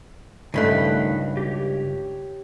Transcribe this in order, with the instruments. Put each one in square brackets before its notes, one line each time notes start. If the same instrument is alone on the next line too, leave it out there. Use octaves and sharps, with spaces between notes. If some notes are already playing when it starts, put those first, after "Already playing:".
[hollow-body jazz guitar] C#2 G2 A3 [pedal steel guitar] D#3 B5 F#6
[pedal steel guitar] G4 C#5